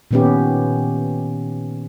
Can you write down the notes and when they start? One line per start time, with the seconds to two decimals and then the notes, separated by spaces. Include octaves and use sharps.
0.11 A#2 D#3 B3 C#4 G4